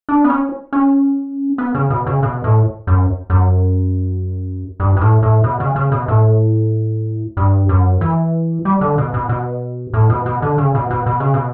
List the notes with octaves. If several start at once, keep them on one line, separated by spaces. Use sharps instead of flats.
D4
B3
C#4
C#4
B3
C#3
B2
C#3
B2
A2
F#2
F#2
G2
G2
A2
A2
B2
C#3
C#3
B2
A2
G2
F#2
E3
G3
D3
B2
B2
B2
A2
B2
B2
D3
C#3
B2
B2
B2
C#3
B2